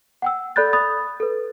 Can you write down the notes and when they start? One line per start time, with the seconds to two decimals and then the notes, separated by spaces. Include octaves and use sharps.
0.22 F#5 G5 E6
0.56 A4 D5 B5 F#6 G6 A6
0.73 B5 D#6 A6
1.20 A4 B4